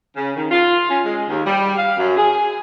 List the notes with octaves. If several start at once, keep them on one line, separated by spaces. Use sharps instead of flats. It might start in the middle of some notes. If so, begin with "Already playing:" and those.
C#3
D#3
F4
C#4
G#3
D#2
G3
F5
F#2
G#4